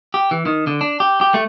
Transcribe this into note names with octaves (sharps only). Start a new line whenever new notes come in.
G4
E3
D#3
D3
D4
G4
G4
A3